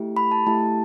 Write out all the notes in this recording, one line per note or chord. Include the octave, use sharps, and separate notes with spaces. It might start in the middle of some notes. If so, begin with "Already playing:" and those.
Already playing: A3 E4 G4
B5
A5
A3 E4 G4 A5